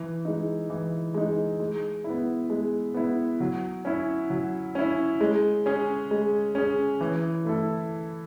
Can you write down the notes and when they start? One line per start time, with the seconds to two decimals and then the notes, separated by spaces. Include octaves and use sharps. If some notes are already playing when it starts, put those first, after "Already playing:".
Already playing: E3
0.25 G#3 D#4
0.70 E3
1.14 G#3 D#4
1.60 G#3
2.04 E4
2.10 B3
2.50 G#3
2.94 B3 E4
3.40 F#3
3.85 C#4 E4
4.30 F#3
4.75 C#4 E4
5.21 G#3
5.66 C#4 G#4
6.11 G#3
6.55 C#4 G#4
7.01 E3
7.45 A3 E4 A4